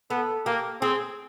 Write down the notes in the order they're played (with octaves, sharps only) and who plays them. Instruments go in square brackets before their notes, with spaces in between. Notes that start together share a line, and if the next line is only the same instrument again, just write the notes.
[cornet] B3 [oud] A4
[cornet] A#3 [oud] G4
[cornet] C4 [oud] G#4